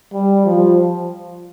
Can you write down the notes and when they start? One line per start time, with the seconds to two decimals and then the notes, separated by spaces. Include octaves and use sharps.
0.13 G3
0.46 F3